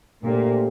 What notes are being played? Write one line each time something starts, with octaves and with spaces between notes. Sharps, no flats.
A#2 A3 D4 G4 C5